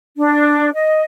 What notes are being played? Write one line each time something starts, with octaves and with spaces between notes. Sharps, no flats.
D4
D#5